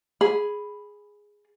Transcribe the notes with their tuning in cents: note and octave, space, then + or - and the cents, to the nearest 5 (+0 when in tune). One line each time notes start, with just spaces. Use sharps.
G#4 +0 B5 +0